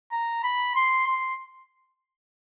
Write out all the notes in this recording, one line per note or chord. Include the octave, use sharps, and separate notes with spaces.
A#5
B5
C6
C6